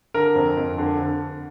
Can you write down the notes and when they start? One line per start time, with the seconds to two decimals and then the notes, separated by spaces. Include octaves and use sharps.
0.14 D3 A#4
0.35 F2
0.57 F2
0.78 D3
0.99 D3